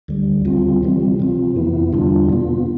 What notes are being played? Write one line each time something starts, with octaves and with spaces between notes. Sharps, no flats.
D2 D3 G3
D2 D3 G3 C4 F4
C3 E3 G3 C4
C3 F3 C4 F4
F2 C3 E3 B3 E4
E2 D3 G3 D4 F4
B2 B3 F4